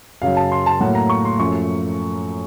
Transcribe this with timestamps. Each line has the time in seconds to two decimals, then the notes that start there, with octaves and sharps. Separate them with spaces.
0.22 F#2 C#3 F#3 F5
0.37 A5
0.52 C6
0.66 A5
0.80 A2 F#3 A#3 F#5
0.95 A#5
1.10 C#6
1.25 C6
1.39 F#2 F3 A3 C#6